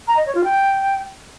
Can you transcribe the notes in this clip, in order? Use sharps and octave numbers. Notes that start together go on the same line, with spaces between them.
A#5
D#5
C#5
F4
G5